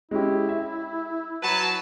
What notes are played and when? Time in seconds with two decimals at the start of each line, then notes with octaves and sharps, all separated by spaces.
0.11 G#3 C#4 E4 G4
0.49 E5
1.42 F#3 B4 A5